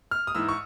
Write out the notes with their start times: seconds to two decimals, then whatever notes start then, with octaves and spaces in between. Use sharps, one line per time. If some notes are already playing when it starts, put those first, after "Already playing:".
0.11 F6
0.27 D#6
0.35 G#2 E3 E6
0.49 C#6